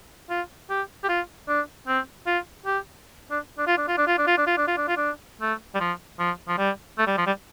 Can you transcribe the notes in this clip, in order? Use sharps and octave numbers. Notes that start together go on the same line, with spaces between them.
F4
G4
G4
F4
D4
C4
F4
G4
D4
D4
F4
D4
F4
D4
F4
D4
F4
D4
F4
D4
F4
D4
F4
D4
A3
G3
F3
F3
F3
G3
A3
G3
F3
G3